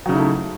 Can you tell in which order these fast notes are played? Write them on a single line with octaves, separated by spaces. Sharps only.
F#3 C#3 D#4 E4 A3